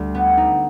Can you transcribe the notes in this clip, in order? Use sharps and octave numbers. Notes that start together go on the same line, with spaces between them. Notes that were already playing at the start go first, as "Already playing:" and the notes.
Already playing: D2 G3
B3
D#4